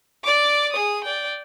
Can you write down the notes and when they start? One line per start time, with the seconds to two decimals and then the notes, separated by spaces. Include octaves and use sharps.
0.24 D5 D6
0.73 G#4 D#6
1.04 D5 G5